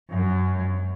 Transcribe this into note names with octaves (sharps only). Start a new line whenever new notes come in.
F#2